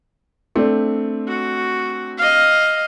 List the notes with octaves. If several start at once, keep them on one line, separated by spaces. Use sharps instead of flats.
A3 C4 D4
F#4
D#5 F5